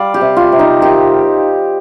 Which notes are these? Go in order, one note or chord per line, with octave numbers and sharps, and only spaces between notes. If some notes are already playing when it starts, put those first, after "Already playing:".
Already playing: G3 D5 F5
G4
C3
F4
C3
D#4
D#3 G4